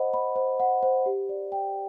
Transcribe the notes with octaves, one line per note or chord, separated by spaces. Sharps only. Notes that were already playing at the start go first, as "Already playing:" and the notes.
Already playing: C5 D#5 F#5 B5
B5
C5
F#5
C5
G4
D5
G5